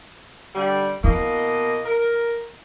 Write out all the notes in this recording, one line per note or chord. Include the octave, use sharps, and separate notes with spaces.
D3 G3
B2 A#3 E4 D#5
A#4